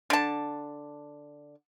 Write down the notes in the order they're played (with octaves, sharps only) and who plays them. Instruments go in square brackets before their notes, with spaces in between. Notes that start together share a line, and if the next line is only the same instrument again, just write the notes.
[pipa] D3 A5